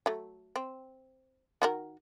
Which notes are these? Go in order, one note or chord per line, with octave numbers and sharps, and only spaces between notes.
F#3 A3
C4
D#3 F#4 A#4